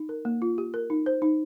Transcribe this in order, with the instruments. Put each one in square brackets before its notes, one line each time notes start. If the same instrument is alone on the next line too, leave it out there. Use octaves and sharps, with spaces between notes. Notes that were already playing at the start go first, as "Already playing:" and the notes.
Already playing: [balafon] D#4
A#4
A#3
F4
G4
A#4
D#4
C5
D#4